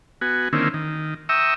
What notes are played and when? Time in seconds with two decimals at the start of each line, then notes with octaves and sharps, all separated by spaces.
0.21 B3 F#4 G#5
0.53 D3 D#3 A#3 C4 C#4 E4
0.74 D#3
1.29 E5 G5 A#5 C#6 D#6 E6